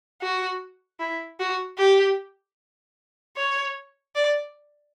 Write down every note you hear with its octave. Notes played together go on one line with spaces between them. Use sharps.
F#4
E4
F#4
G4
C#5
D5